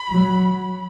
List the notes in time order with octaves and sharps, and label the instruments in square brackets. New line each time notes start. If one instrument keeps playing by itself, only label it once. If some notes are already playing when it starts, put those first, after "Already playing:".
Already playing: [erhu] B5
[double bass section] F#3